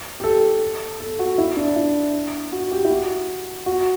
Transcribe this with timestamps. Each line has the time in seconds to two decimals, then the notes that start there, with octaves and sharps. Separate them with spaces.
0.20 G4
0.24 A4
1.00 A4
1.19 F#4
1.38 E4
1.57 D4
1.76 E4
2.52 F#4
2.71 G4
2.85 E4
2.91 F#4
3.66 F#4